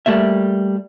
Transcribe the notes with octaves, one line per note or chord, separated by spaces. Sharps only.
G3 A3 A#3 E5